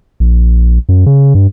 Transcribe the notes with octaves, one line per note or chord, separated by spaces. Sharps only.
A#1
F#2
C#3
G2